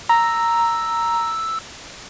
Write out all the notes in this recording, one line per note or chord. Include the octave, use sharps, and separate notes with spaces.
A#5 E6